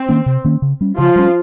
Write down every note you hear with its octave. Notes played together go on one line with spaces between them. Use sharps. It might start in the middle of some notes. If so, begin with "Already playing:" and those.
Already playing: C4
D#3 A#3 C#4
C3
D#3 A#3 C#4
C#3
G3 C#4
C#3 F3 F4
G3 C#4